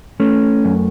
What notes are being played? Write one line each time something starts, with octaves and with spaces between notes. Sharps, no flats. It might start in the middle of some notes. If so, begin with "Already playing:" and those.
A3 C#4
F#2